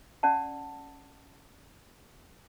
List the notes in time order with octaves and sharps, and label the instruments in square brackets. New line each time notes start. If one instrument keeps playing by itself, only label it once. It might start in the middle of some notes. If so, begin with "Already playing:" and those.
[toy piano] C#4 D5 F#5 A5